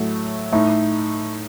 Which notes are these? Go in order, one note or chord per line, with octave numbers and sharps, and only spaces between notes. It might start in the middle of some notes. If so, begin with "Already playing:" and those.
Already playing: A2 F#3 A3
A2 A3 D#4